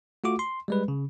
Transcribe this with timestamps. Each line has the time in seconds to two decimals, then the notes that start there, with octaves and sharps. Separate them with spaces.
0.24 A3 F4 F#4 D6
0.39 C6
0.68 G3 G#3 B4
0.88 C#3